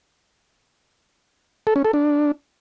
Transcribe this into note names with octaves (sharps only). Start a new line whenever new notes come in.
A4
C#4
A4
D4